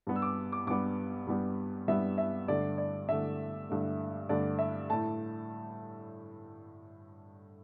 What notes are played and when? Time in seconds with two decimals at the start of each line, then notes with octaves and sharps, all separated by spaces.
0.07 G2 G3 B3
0.16 E6
0.22 D6
0.52 D6
0.67 G2 G3 B3 D6
1.27 G2 G3 B3
1.88 G2 G3 B3 E5
2.18 E5
2.48 G2 D3 A3 D5
2.78 D5
3.08 G2 D3 A3 E5
3.69 G2 D3 A3
4.29 G2 D3 A3 D5
4.59 E5
4.89 A2 A3 A5